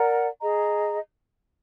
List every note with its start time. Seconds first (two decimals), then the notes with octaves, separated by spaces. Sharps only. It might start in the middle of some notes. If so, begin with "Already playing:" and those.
Already playing: A#4 D5 F#5 A#5
0.42 G#4 D#5 A#5